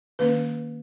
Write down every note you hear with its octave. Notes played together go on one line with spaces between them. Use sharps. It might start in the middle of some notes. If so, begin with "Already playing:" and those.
D#3 A#3 C#4 B4